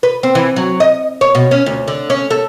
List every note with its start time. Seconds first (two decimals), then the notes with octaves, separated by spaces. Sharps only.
0.03 B4
0.23 C4
0.35 E3
0.56 F#3
0.80 D#5
1.21 C#5
1.35 B2
1.51 C#4
1.66 D2
1.88 D3
2.10 C#4
2.30 A4